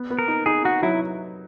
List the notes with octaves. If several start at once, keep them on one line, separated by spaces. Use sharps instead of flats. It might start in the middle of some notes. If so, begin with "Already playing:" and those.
Already playing: B3
B3
A#4
D#4
D#4 G#4
D#4 F#4
F#3 E4